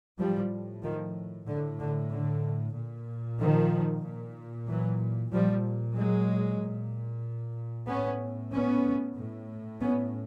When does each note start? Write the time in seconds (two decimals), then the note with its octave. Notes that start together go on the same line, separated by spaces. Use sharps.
0.19 A2 F3 G3
0.83 D#3 F3
1.47 A2 D3
1.80 D3
2.11 D3
2.76 A#2
3.40 D#3 F3
4.04 A#2
4.68 E3 F#3
5.32 A#2 F3 G3
5.96 F#3 G#3
6.60 A#2
7.88 A2 B3 C#4
8.53 B3 C#4
9.17 A2
9.81 B3 C#4